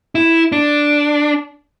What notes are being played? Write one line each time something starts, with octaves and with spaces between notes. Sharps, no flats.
E4
D4